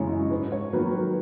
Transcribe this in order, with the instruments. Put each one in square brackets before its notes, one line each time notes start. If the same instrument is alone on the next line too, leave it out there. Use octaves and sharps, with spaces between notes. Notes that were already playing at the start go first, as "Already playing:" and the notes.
Already playing: [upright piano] F#2 C#3 E3 G#3 C#5
D#5
G#2 B4
C#5
D#3 F#3 A#3 B4
B4